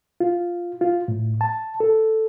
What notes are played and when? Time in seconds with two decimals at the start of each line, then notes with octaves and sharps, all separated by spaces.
0.20 F4
0.81 F4
1.08 A2
1.41 A5
1.80 A4